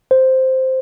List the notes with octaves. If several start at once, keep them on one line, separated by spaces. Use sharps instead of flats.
C5